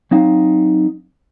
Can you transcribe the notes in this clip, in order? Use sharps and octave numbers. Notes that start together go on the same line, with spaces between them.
F#3 C4 D#4 F5